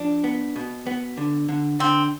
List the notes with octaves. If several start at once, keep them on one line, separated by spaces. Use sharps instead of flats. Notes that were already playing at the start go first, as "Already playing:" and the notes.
Already playing: F3 D4
B3
B2
B3
D3
D3
D3 C4